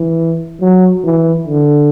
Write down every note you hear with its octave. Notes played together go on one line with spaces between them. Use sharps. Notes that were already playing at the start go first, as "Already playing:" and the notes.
Already playing: E3
F#3
E3
D3